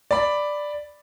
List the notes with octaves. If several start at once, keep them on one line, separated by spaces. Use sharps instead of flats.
D5 B5